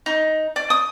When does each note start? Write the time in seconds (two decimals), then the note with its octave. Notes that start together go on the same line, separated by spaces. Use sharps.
0.06 D#4
0.56 D5
0.70 D#6